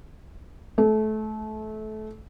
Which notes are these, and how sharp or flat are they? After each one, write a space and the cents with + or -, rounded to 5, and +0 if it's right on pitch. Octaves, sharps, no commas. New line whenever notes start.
A3 -25